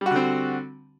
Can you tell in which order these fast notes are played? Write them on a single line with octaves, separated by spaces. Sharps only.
G3 F#4 D3 C4